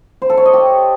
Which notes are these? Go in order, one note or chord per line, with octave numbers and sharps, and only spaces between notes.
C5
A4
C#5
D#5
G4